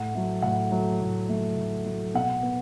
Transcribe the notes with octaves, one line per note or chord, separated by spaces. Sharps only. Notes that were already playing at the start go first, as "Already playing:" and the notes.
Already playing: A2 F#5
F#3 A3
A2 F#5
F#3 A3
A2
F#3 A3
A2
F#3 A3
B2 F#5
B3